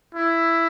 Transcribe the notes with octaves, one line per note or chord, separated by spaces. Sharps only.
E4